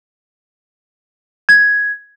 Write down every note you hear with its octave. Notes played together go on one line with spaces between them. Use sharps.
G#6